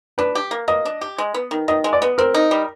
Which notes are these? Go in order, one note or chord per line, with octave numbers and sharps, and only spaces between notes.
D4 B4
G4
A#3
A#3 D#5
D4
G4
G#3
B3
D#3
D#3 D#5
G#3
D5
B3
C4 A#4
D#4
G3